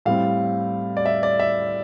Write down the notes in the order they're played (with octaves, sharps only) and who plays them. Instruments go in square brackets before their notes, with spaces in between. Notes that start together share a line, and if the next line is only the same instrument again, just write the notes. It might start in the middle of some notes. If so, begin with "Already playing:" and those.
[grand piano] A2 G3 C4 F5
D5
E5
D5
E5